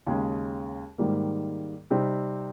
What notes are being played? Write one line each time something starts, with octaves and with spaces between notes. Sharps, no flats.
D#2 C#3 G#3
G#2 D#3 G3 A#3
C3 G3 C4 D#4